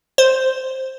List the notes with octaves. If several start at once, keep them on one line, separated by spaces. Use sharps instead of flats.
C5